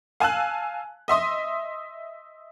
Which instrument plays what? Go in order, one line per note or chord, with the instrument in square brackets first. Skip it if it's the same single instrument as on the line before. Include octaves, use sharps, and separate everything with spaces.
[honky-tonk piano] F5 G#5 A5 E6 F#6
D#5 E5 C6 D#6